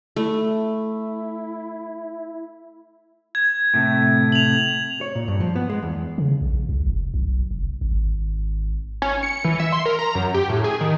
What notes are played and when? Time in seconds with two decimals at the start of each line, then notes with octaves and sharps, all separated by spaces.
0.16 A3 E4
3.35 G#6
3.74 A2 C3 A3
4.32 F7 F#7
5.01 C#5
5.15 A#2
5.28 G2
5.40 F3
5.56 B3
5.70 G#3
5.83 E2
6.18 C#3
6.41 A#1
6.69 C2
6.87 F1
7.14 B1
7.51 F1
7.81 G#1
9.02 C#4
9.23 C#7
9.45 E3
9.60 E5
9.72 C6
9.86 A#4
9.99 A#5
10.15 F#2
10.34 G4
10.50 A2
10.64 G#4
10.81 D#3